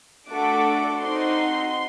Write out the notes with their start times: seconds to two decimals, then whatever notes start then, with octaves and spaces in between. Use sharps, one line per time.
0.28 A3 D4 F#4 A4 D6
1.00 C4 D#4 F#4 C6